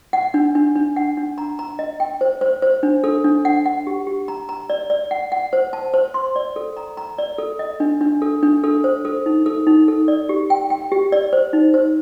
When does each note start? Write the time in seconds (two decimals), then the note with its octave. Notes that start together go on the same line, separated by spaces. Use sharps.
0.13 F#5
0.34 D4
0.55 D4
0.76 D4
0.96 F#5
1.17 D4
1.38 A#5
1.59 A#5
1.79 D#5
2.00 G5
2.21 C5
2.41 C5
2.62 C5
2.83 D4
3.04 A4
3.24 D4
3.45 F#5
3.66 F#5
3.87 G4
4.07 G4
4.28 A#5
4.49 A#5
4.70 D5
4.90 D5
5.11 F#5
5.32 F#5
5.53 C5
5.73 A5
5.94 C5
6.14 C6
6.36 D5
6.56 A4
6.77 A#5
6.97 A#5
7.18 D5
7.38 A4
7.59 D#5
7.80 D4
8.01 D4
8.22 A4
8.43 D4
8.64 A4
8.84 C5
9.05 A4
9.26 D#4
9.46 A4
9.67 D#4
9.88 A4
10.08 D5
10.29 G4
10.50 G5
10.70 G5
10.92 G4
11.12 D5
11.33 C5
11.53 D#4
11.74 C5